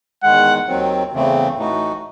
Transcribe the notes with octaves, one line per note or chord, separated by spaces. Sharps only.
E2 D#3 G#3 F#5
D#2 D#3 F#3 C4
E2 C#3 E3 A3 C4
A2 E3 A3 D#4 F#4